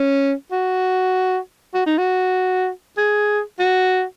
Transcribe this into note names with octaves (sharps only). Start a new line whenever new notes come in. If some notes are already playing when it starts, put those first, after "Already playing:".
Already playing: C#4
F#4
F#4
D#4
F#4
G#4
F#4